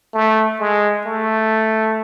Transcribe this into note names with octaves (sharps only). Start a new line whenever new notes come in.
A3
G#3
A3